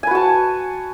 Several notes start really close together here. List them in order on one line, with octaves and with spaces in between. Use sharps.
G#5 B4 F#4 A5